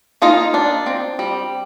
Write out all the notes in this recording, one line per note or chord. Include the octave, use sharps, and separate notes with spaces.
A#3 D#4 F4
D4
C4
G3